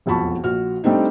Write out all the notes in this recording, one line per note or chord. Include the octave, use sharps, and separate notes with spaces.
E1 B1 F2 A5 B5 C#6
A#1 F#4 F6
G3 A3 C4 D4 D#4